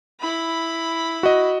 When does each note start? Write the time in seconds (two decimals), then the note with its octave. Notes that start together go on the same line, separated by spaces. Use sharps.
0.20 E4 B5
1.23 F#4 D#5